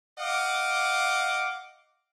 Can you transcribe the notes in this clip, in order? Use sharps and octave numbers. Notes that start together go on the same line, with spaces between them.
D#5 F5 F#5 D6